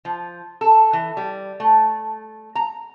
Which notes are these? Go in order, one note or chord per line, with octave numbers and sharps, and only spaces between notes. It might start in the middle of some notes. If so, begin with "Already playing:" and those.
F3
A4
E3
G3
A3
A#5